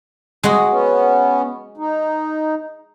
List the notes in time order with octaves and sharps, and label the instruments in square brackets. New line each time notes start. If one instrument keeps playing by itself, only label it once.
[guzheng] G#3 F#4
[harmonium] B3 C#4
D#4